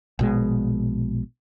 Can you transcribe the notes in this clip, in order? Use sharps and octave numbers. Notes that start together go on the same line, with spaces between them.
A#1 B2 G#3